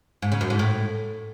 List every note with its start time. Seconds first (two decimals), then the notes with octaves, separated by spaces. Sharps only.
0.22 G#2
0.32 C#3
0.41 F#2
0.50 G#2
0.59 A2